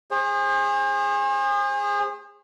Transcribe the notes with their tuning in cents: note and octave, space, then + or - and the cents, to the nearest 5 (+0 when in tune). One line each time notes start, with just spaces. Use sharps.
G#4 -30 C5 +40